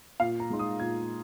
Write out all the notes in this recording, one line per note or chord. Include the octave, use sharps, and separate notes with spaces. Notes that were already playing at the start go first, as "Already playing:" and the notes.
A#2 F5
A#5
G#3 D#4 C6
D#6
A#2 G#6